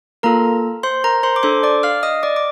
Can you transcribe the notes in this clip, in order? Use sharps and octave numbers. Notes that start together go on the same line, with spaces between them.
A#3 F4 A4 A#4 A#5
C5 C6
A#4 A#5
C5 C6
D6
D4 A4 C5 C6
D5 D6
F5 F6
D#5 D#6
D5 D6
D6